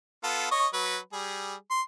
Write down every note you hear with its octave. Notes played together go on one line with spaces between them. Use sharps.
B3 F4 A4
C#5 D#5 C#6
F#3 B4
G3 G#4
C6